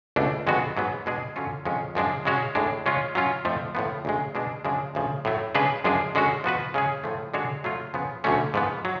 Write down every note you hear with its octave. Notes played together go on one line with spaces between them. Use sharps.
C#2 B2 A3 D4
F2 D3 G#3 B3 F#4
G#2 F#3 B3
B2 G#3 D4 G#4
D3 F#3 C#4 F4
F2 F3 G#3 C#4
F#2 F3 G#3 D4
C#3 G#3 C#4 F#4 C#5
A2 G#3 D4
C#3 G#3 C#4 F4
F#3 C#4 F4
F2 F3 A3
A2 F3 B3
D2 C#3 G#3
B2 G#3 D4
F#2 C#3 F3 G#3 D4
D2 C#3 F3
A2 F#3 A3
C#3 G#3 D4 G#4 B4
F#2 F3 G#3 D4 G#4
D3 G#3 C#4 F#4
F3 B3 F#4 B4
C#3 G#3 C#4 G#4
A2 F3 A3
D3 G#3 D4 F#4 C#5
F#3 A3 F4
C#3 F3 B3
D2 D3 F#3 A3 C#4
G#2 F3 B3
F#3